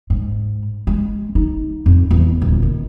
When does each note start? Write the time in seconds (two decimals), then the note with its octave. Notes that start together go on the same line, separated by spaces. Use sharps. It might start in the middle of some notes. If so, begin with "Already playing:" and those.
0.10 G#2
0.87 G#3
1.35 D#4
1.86 F2
2.11 E2
2.42 D#1
2.62 D#3